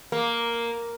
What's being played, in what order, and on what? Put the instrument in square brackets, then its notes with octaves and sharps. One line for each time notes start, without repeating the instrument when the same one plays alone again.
[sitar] A#3